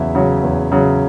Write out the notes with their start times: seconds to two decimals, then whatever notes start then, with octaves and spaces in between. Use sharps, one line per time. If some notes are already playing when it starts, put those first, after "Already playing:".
Already playing: E2 C#3 F#3 E5
0.15 C#3 F#3
0.43 E2
0.72 C#3 F#3